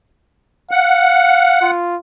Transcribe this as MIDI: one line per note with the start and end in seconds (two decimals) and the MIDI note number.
0.71 1.61 77
0.71 1.71 78
1.62 1.96 65